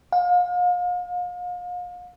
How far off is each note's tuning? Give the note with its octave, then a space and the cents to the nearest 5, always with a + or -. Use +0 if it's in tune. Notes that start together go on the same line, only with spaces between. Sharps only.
F5 +40